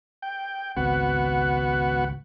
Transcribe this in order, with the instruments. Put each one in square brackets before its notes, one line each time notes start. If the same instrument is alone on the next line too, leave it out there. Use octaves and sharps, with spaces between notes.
[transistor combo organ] G5
[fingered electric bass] G#1 C#2 C4 [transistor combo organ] B3 F#4 F#5